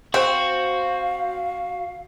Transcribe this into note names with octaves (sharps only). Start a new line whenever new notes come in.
C4 F#4 C5 F5